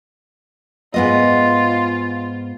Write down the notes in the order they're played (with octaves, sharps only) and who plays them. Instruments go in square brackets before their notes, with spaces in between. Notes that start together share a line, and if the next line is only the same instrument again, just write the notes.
[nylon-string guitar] G#2 B3 D#5 [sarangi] F4